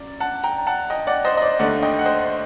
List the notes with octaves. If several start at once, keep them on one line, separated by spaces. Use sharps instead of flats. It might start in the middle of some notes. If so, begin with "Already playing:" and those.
Already playing: F#2 D5
F#5 A5
G5 A#5
F#5 A5
D#5 G5
D5 F#5
C5 D#5
D#5
D5
D#2 D3 A3 D5 F#5
D#5 G5
F#5
C5 D#5